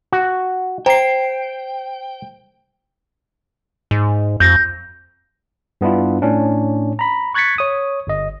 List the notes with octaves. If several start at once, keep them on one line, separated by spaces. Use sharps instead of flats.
F#4
C5 G5 A#5 C7
G#2
F2 G6 A#6
G2 B3 D4 E4 F4
A2 C#4 D4
A#5 B5
C#6 F#6 G#6 A6 B6 C#7
C#5 D#6
G1 D#5